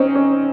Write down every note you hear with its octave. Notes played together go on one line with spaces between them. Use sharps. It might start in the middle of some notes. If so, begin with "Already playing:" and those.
Already playing: C4 C#4 D#4
C#4